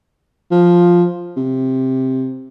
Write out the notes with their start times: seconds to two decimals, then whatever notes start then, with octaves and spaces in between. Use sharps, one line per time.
0.51 F3
1.37 C3